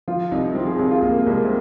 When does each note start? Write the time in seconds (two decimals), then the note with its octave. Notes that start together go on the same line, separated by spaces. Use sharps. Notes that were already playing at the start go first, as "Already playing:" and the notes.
0.08 F3 F4
0.32 C2 D#4
0.55 F3 C4
0.67 G#4
0.79 C2 G#4
0.91 F4
1.02 C2 A#3
1.18 A#3
1.26 C2 G#3
1.45 C4